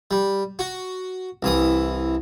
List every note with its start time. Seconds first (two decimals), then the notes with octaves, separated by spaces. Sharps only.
0.11 G3
0.59 F#4
1.43 C2 E3 D#6